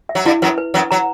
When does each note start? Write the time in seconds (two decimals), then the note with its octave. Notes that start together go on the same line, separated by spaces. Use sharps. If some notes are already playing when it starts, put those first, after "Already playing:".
0.09 E5
0.15 F#3
0.25 G2 G3 E4
0.42 F#2 F#3 B4
0.58 B4
0.74 F#2 F#3 B4
0.91 F#3 A#5